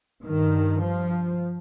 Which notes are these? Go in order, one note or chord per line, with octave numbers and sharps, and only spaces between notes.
G2 D#3
F3